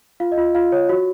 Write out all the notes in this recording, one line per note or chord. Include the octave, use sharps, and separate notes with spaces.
F4 F5
D#5
F4
F4 F5
C#5
F#4